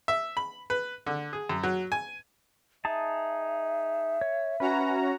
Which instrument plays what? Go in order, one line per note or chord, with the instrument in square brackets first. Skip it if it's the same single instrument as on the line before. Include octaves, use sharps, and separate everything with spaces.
[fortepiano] E5
B5
B4
D3
G#4
F#2
F#3
G#5
[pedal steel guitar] D#4 G#4 A5 [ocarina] E5
[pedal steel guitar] C#5
[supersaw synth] C#4 F#4 A#5 [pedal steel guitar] B4